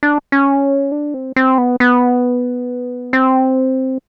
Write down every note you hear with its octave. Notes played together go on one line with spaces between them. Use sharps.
D4
C#4
D4
C4
C4
B3
B3
C4